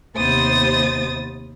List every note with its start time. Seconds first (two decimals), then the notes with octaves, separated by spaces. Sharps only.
0.16 D#2 C3 B3 C5 D#6 A6